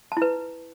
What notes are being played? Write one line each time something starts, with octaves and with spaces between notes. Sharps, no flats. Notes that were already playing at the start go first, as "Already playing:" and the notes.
E4 B4 A5